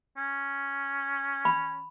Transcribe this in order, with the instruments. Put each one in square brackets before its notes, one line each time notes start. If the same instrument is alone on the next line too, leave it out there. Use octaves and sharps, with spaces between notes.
[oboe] C#4
[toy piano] B5